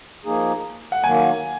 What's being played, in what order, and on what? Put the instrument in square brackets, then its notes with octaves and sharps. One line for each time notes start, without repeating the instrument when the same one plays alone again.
[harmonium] F3 A#3 D#4 G#4
[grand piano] F#5
[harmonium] D#3 F#3 A#3 [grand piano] G#5